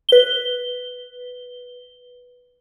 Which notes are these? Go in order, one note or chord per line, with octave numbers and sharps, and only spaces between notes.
B4 G7